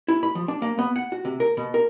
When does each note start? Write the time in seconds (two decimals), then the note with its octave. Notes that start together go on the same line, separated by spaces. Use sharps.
0.08 E4
0.23 B5
0.35 F3
0.48 D4
0.62 A#3
0.79 B3
0.96 F#5
1.12 F#4
1.25 C3
1.40 A#4
1.57 B2
1.74 A#4